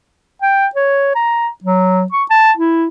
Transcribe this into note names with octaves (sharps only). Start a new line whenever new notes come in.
G5
C#5
A#5
F#3
C#6
A5
E4